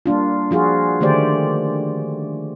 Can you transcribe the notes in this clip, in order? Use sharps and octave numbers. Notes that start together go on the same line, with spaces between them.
G3 A#3 D4 F4
F3 F4 F#4 G#4
D3 D#3 A3 G4 C5 D5